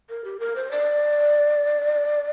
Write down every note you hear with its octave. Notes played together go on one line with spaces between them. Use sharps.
A#4
G4
A#4
C5
D5